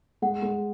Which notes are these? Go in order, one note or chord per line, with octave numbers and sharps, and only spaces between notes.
G#3 F#5
G#3